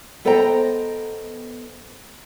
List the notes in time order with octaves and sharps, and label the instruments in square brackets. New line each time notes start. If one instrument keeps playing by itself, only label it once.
[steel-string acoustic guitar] B3 A4 C5 D#5 G5 A#5